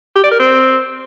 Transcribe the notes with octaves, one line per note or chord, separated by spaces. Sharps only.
G4
D5
A#4
C4